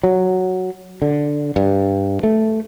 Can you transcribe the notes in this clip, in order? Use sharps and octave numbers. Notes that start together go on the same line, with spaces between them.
F#3
D3
G2
A3